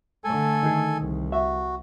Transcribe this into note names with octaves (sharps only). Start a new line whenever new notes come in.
D3 A3 A4 G#5
D#3 G#4
C2
F#4 E5